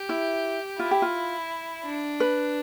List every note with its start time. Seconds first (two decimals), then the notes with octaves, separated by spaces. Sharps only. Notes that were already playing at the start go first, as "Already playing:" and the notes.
Already playing: G4
0.09 E4
0.79 E4 F4
0.91 G4
1.02 F4
1.85 D4
2.20 B4